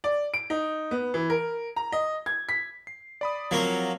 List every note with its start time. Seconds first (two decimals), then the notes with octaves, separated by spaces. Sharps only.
0.04 D5
0.34 D7
0.50 D#4
0.91 B3
1.14 E3
1.30 A#4
1.76 A#5
1.92 D#5
2.26 G#6
2.49 B6
2.87 C7
3.21 D5 B5 D#6
3.51 F3 F#3 A#3 C4